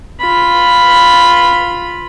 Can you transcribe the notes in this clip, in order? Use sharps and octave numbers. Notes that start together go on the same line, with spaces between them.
F4 B5